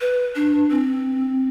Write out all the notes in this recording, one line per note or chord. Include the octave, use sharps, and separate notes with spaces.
B4
D4
C4